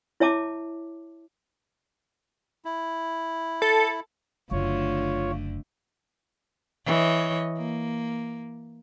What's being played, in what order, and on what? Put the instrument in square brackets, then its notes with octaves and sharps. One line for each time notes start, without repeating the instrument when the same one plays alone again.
[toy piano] E4 C#5 E5 A5 D6
[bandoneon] E4
[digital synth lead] A4
[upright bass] F#1 [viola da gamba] D3 A3 [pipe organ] F4 C#5
[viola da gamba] E3 C#5 D#5
A#3